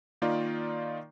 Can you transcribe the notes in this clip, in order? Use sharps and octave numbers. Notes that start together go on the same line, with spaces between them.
D#3 A#3 D#4 F4 D5